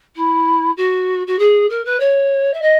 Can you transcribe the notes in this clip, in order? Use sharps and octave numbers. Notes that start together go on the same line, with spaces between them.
E4
F#4
F#4
G#4
A#4
B4
C#5
E5
D#5